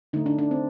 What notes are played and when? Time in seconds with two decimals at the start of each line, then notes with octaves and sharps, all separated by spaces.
0.13 D3 A3 D#4
0.26 D4
0.38 D4
0.51 C4